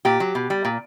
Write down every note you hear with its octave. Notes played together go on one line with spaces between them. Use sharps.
A#2 G4
F#3
B2
G3
A#2